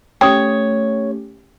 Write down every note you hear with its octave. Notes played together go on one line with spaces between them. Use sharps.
A3 C#4 G4 C#5 G5 D#6